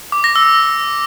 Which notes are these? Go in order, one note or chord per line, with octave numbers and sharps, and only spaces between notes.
D6
A#6
E6